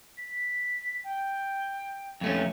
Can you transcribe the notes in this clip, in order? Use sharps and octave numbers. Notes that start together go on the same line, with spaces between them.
B6
G5
F2 A3 C#4